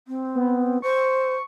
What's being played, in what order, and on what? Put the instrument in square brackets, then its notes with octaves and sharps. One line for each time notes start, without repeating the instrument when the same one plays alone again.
[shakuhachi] C4
[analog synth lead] B3
[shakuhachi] C5 [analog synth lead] C#6